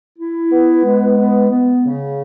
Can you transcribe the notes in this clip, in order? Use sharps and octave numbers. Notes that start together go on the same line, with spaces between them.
E4
B3
G#3
B3
B3
C#3